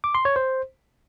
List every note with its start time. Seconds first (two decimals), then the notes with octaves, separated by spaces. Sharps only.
0.04 D6
0.15 C6
0.25 C#5
0.36 C5